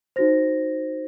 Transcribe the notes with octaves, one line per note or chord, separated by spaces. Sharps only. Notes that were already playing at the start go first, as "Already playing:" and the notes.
D#4 F#4 C5 A#6